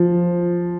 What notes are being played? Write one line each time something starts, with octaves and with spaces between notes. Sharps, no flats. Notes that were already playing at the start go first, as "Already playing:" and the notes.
Already playing: F3